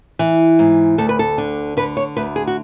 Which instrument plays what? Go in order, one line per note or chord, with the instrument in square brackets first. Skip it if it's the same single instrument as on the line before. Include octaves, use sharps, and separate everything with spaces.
[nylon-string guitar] E3
G#2
D2 A4
B4
A4
D3
D3 B4
C#5
D2 B4
G#4
F#4